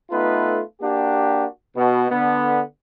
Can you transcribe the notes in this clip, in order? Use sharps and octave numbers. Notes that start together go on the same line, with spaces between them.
A3 B3 D#4 F4 A4 B4
A#3 D4 F#4 G4
B2
D3 B3